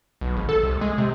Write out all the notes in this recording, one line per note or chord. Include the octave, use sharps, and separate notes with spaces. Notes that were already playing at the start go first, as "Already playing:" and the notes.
B1
G#1
A4
C2
G#3
C3